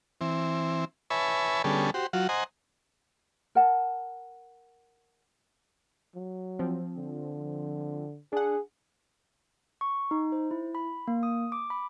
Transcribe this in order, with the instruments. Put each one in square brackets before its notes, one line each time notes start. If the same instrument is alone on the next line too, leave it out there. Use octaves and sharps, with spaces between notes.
[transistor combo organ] E3 C4
B4 C#5 E5 G#5 A5 B5
D3 G3 B3 C#4 G#4 A4
F#4 G4 C5
F#3 F4 F#4
C5 D#5 F#5 G#5 A#5
[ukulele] A#4 F#5 A5
[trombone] F#3
[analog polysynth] F3 C4
[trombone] D3
[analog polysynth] D4 F#5 [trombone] G#4
[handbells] C#6
D#4
C5
E4
B5
A#3
D#6
D6
B5